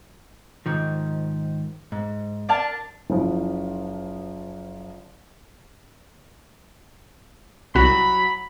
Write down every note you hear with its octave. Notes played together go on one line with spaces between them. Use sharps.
G#2 D#3 F3
G#2
D4 A#4 A5
F#1 F3
C2 F#3 F#4 B5